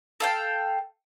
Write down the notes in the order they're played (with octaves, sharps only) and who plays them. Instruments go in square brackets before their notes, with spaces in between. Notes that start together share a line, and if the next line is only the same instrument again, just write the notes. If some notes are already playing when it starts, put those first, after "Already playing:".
[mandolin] A4 F5 G5